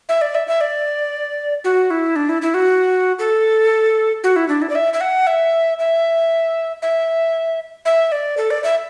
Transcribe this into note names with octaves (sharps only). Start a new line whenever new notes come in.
E5
D5
E5
E5
D5
F#4
E4
D4
E4
E4
F#4
A4
F#4
E4
D4
E4
D5
E5
E5
F#5
E5
E5
E5
E5
D5
A4
D5
E5